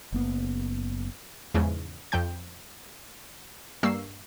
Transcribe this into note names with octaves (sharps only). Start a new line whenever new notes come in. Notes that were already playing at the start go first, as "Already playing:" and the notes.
F#1 A#3 B3
E2 G#2 C#3 F3 G#3
F2 F3 G5 G6
G2 G3 A#3 C#6 E6 C7